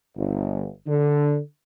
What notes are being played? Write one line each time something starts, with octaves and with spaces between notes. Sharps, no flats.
G1
D3